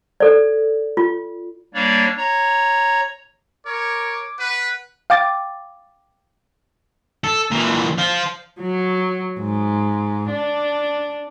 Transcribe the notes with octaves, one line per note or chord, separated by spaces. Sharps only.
A4 D5
F4
G3 A#3 D4 C#5 D5
C#5 A#5
A#4 C#5 D6
B4 F#5
F5 G5 D6 A6
A4
A#2 E3
C5 F5
F#3
G#2
D4